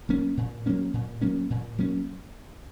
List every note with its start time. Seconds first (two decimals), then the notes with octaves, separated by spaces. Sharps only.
0.09 F#3 A#3 C#4
0.37 A#2
0.66 F#3 A#3 C#4
0.93 A#2
1.21 F#3 A#3 C#4
1.50 A#2
1.78 F#3 A#3 C#4